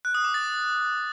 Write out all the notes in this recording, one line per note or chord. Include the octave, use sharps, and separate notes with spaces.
F#6
D#6
D6
A6